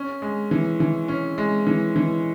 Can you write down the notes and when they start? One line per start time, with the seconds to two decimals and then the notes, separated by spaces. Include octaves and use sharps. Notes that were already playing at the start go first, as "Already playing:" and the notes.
Already playing: C#4
0.22 G#3
0.51 E3
0.80 E3
1.08 C#4
1.38 G#3
1.67 E3
1.96 E3